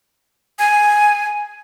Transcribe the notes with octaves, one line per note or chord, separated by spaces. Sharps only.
G#5